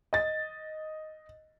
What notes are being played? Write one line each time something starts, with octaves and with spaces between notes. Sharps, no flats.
D#5 A6